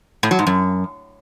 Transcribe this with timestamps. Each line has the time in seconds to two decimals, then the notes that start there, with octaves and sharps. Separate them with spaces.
0.23 A2
0.31 F#3
0.39 G#2
0.47 F#2